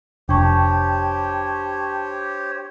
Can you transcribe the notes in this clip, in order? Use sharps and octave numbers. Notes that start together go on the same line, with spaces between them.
F1 D4 G4 C5 C#5 G5 A5 C#6